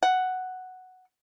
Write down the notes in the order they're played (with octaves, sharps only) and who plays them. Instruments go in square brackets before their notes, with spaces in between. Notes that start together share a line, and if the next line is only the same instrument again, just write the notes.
[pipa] F#5